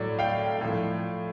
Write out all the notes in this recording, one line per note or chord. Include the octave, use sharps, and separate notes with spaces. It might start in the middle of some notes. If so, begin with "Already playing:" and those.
Already playing: A2 F#3 D5
F5 G5
A2 F3